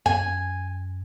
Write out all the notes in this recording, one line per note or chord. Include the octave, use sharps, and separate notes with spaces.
F#2 G#5